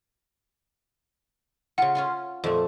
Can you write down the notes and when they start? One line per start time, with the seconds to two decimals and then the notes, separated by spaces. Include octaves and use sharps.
1.78 C#3 F4 F#5
1.95 C#4 F4 C6
2.44 F2 A#2 A3